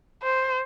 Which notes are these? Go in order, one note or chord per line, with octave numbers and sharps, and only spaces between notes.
C5